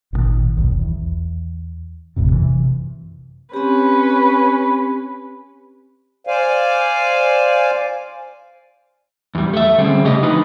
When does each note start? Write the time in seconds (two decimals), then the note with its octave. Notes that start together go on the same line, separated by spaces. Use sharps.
0.13 G#1 G2 A#2 D#3
0.57 F1 B1 D#3
0.79 E2
2.16 G#1 F2 A2 C3
2.32 F#2 C3 E3
3.53 C4 C#4 G4 B4
6.27 C5 D5 F5 G#5
9.35 E2 G3
9.53 A3 E5
9.78 D3 G3 C4 C#4 G#4
10.04 C#3 A3 G4 D#5
10.22 D3 F3 D#4 B4